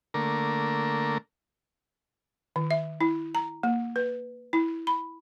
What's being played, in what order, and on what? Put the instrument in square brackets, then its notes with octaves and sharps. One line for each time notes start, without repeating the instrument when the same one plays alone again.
[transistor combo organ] D3 A3 A#3 A#4
[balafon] D#3
E5
E4
A#5
A#3
B4
E4
B5